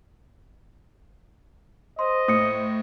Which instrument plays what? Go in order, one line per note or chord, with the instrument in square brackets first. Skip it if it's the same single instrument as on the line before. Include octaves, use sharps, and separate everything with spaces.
[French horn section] C5 [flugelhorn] D#5 [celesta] C6
[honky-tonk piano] A2 [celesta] D#6 C#7